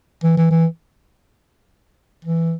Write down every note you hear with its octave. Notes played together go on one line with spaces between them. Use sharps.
E3
E3
E3
E3